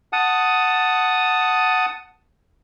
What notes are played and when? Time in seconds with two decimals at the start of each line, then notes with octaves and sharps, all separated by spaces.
0.13 F#5 A5 D#6